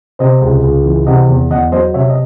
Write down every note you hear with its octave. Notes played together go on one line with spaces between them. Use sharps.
C3 C5 D#5
C#2
C#2
E3
C3 D#5 F#5
E2
E2 D#5 F#5
F#3 C5 D#5
C3 C#5 E5
D#5